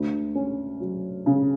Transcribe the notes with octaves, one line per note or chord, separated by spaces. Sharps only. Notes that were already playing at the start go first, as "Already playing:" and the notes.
Already playing: D2
C#4
F#3
C#3